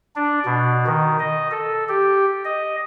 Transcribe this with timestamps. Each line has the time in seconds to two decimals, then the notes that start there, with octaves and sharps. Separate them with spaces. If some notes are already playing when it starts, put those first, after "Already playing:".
0.16 D4
0.46 B2
0.86 D#3
1.19 D#5
1.51 A4
1.89 G4
2.45 D#5